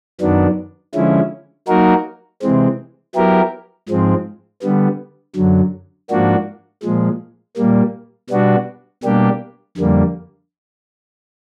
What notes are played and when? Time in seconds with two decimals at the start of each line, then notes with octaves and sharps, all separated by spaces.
0.21 F#2 D#3 F#3 B3 D4
0.95 D3 F3 G#3 C#4 E4
1.68 F#3 A#3 D#4 F#4 A#4
2.42 C3 E3 G#3 C4
3.15 F#3 B3 E4 G4 A#4
3.89 G#2 F3 G#3 C4
4.62 D3 G3 B3
5.36 F#2 D3 F#3
6.10 G#2 F3 A#3 D4 F#4
6.83 A#2 F3 G#3
7.57 A#2 G3 A#3
8.30 B2 G3 B3 D4 F#4
9.04 B2 G3 A#3 D4 G4
9.77 F2 D3 G3 A#3